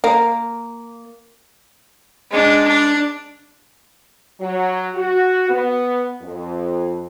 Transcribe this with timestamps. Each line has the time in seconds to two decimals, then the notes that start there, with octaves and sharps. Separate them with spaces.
0.04 A#3
2.31 G#3 D4
2.68 D4
4.40 F#3
4.95 F#4
5.49 B3
6.22 F2